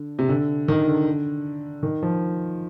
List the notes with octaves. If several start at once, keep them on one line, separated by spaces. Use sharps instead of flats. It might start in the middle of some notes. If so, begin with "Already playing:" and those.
Already playing: D3
C3
D3
D#3
D3
D#3
F3